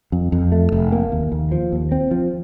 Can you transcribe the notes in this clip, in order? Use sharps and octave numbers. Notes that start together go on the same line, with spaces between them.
F2
F2
A3
F1
A#3
D#2
D#2
F3
D#2
C4
F3